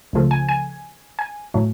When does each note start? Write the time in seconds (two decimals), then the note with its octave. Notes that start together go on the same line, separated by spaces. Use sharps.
0.13 C#2 C#3 F3 A3
0.31 G#5
0.49 G#5
1.19 G#5
1.54 A2 F#3 A3